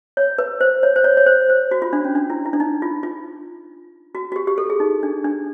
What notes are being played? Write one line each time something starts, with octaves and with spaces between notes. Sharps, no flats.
C#5
B4
C5
C#5
C5
C#5
C#5
C5
C5
F#4
F4
D4
C#4
D4
E4
E4
D4
D#4
F4
F4
F#4
F#4
G4
G4
A4
G#4
D#4
D4
D4